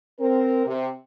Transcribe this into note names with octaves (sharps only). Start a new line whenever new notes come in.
C4 A#4
C3